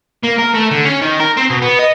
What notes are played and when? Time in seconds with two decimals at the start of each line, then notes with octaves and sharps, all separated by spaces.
0.23 A#3
0.38 A#4
0.54 A3
0.71 D3
0.85 C#4
1.02 D#3
1.20 A#4
1.37 C4
1.50 B2
1.62 B3
1.79 D#5